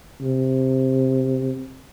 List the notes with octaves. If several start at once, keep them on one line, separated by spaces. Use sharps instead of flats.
C3